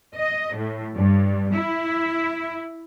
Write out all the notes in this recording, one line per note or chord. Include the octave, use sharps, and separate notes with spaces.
D#5
A2
G2
E4